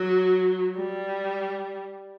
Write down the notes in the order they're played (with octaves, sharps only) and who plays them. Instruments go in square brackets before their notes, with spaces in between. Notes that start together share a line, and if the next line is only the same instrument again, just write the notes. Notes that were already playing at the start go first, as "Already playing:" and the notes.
Already playing: [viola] F#3
G3